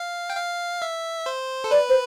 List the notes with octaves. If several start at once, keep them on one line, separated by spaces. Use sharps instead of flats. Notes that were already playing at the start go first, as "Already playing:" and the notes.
Already playing: F5
G5
F5
E5
C5
A4
B4 D5
C5